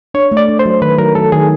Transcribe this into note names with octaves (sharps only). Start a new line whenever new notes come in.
D4 C#5
A3
D5
D4
C5
F#3
D#3 B4
F#3 A#4
F#3 A4
D#3 G#4